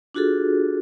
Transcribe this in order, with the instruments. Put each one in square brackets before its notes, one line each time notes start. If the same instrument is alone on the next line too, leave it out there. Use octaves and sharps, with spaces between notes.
[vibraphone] D4 F4 F#4 G#4 A4